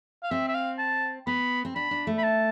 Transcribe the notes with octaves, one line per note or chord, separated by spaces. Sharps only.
F5
C4 E5
E5
F5
A5
B3 B5
C4
D4 B5
D4
A3
B5
A5